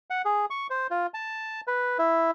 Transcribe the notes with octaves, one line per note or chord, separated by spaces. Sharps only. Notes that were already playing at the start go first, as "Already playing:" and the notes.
F#5
G#4
C#6
C5
F4
A5
B4
E4